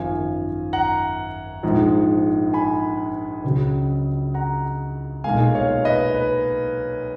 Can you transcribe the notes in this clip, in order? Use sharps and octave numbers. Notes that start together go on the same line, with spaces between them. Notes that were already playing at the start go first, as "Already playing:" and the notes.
Already playing: G#1 F#2 F3 F5 G#5
F#5 A#5
A#1 G#2 F3 G#3
G#5 B5
C#2 C#3 F#3
F#5 A#5
B1 A#2 G#3 F5 G#5
C#5 F5
B4 D#5
B4